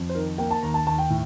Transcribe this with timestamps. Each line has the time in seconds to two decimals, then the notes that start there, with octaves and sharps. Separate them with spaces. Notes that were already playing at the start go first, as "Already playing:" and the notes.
Already playing: F2
0.09 C5
0.15 D#3 A#4
0.38 A#3 G5
0.51 A5
0.63 D#2 A#5
0.74 A5
0.86 D#2 A5
0.98 G5
1.10 A2